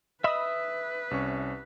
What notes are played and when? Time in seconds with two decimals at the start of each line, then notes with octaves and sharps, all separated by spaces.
0.24 B4 D#5 E5 B5 D#6 E6
1.11 C2 C#4 C#6